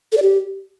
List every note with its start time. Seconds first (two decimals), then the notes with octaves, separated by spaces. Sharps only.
0.12 A4
0.17 D5
0.22 G4